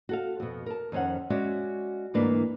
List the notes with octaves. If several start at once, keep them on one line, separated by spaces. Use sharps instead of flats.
F#4 A4 F5
F2 B2
A#4 A5
F2 D#3 C#4 C5 F#5
G#3 C#4 F#4 C#5 D5 E5
D2 G#2 E3 A#3 D4 B4